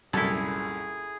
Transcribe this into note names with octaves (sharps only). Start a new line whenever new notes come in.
C2 F#2 A#2 E4 G#4 A4